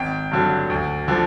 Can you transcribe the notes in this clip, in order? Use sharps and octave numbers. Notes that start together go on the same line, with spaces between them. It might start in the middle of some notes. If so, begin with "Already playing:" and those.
Already playing: G#1 G5
G2 D3 F#3
D2
D3 F3